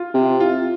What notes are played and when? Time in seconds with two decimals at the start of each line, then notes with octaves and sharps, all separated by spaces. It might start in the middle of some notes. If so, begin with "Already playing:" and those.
Already playing: F4
0.14 C3
0.40 F4